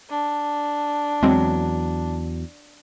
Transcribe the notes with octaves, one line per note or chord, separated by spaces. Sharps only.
D4
E2 F#3 G#3 C4